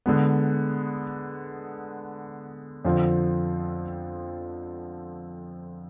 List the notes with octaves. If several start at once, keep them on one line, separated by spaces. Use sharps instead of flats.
D3 G#3 B3
F2 D3 F3 C4 F4